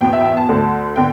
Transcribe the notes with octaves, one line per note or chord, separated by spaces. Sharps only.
E2 B2 B3 G5
E5
G5
E5
A5
D2 D3 A3
D3 B3 G5